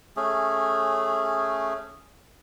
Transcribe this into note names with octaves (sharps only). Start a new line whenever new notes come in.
A3 C#4 G#4